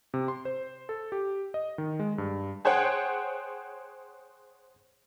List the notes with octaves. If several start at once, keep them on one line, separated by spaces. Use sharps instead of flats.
C3
C6
C5
A4
G4
D#5
D#3
G#3
G2
G#4 C5 C#5 F#5 G5